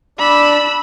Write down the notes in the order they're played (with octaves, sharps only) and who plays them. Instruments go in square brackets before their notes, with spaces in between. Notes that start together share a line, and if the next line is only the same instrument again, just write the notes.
[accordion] D4 [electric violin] B5 E6